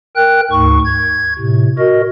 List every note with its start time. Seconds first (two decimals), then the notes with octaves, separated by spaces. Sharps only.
0.16 A#4 G5 F#6
0.51 D2 G#2 C#6
0.85 G#6
1.38 A2 C3
1.79 F#4 A#4 D#5